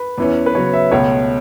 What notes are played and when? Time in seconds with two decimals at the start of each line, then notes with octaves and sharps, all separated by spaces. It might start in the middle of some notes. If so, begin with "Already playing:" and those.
Already playing: B4
0.18 E2 E3 C#4
0.46 B4
0.55 C#3 F#3 B3 C#5
0.73 E5
0.91 C#2 B2 A3 C#5